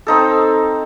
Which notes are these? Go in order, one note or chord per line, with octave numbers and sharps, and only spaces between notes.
C4 D#4 A4